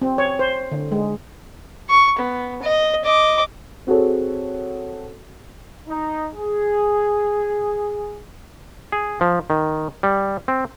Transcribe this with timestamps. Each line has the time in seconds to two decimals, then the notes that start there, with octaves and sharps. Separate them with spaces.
0.02 C4
0.18 C#5
0.39 C5
0.72 D3
0.92 G#3
1.89 C#6
2.18 B3
2.63 D#5
3.04 D#5 D6
3.87 C4 F#4 G#4 A4 C#5
5.87 D#4
6.35 G#4
8.92 G#4
9.21 F3
9.50 D#3
10.03 G3
10.48 C4